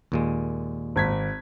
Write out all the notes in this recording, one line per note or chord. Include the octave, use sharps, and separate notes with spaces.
D#2 A#2 G#3
G#1 G#6 B6